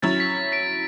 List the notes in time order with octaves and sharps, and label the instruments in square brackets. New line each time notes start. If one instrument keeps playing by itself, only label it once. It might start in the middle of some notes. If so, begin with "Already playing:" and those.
[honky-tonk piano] F#3 C#4 E4 [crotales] A6
[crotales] B6
B6 D7